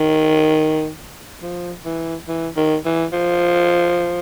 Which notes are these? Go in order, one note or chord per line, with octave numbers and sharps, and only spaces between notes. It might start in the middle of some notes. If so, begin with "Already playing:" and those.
Already playing: D#3
F3
E3
E3
D#3
E3
F3